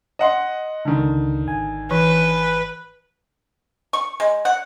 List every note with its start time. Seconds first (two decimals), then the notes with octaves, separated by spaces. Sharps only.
0.19 D#5 F#5 C6
0.85 C#2 D3 D#3
1.45 G#1 G#5
1.91 E3 B4
3.93 C#6
4.20 G#3
4.45 F#5